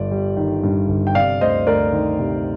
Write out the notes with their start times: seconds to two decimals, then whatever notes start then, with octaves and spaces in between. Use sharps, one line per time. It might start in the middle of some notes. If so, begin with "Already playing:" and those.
Already playing: G1 G2 D5
0.11 G3
0.37 D#3
0.63 G2
0.88 G1
1.07 G5
1.15 C3 D5 F5
1.41 D2 C5 D#5
1.67 D2 A#4 D5
1.93 D#3
2.19 C3